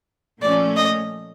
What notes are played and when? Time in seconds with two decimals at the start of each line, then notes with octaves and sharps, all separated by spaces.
0.41 A#2 F3 A3 C#4 D5
0.77 D#5